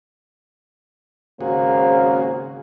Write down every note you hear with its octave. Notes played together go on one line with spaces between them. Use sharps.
G#1 C#3 A#3 F#4 G#4 C5